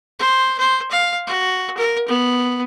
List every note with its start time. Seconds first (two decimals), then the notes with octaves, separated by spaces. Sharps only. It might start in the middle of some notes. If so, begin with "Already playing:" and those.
0.19 C5
0.59 C5
0.91 F5
1.27 F#4
1.77 A#4
2.08 B3